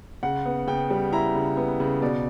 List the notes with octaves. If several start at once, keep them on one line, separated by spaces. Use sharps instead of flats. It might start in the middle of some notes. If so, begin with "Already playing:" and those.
C#3 F#5
B3
C#3 G5
G3
E4 A#5
C#3
B3
C#3
B2 D5